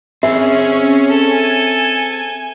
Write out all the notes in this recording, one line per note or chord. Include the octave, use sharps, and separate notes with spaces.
C4 C#4 G#4 E5
A4 G#5